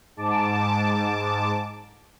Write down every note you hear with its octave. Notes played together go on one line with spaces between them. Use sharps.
G#2 A5 D6